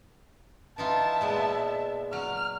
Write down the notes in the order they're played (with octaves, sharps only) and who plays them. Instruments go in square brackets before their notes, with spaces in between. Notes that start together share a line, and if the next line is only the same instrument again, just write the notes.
[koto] E3 D#4 F4 [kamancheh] E5 A5
[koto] A#2 G#3 B3
[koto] F#3 [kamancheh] F6